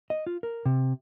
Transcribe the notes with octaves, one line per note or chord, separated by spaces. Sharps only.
D#5
F4
A#4
C3